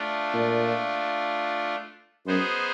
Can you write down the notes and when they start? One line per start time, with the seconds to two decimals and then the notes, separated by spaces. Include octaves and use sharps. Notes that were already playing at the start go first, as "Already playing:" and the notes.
Already playing: A3 D4 F4
0.34 A#2
2.27 F#2 B3 D#4 G#4 C5